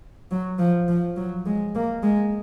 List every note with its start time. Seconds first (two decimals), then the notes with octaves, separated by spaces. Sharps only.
0.31 F#3
0.59 F3
0.88 F3
1.16 F#3
1.46 G#3
1.75 A#3
2.03 G#3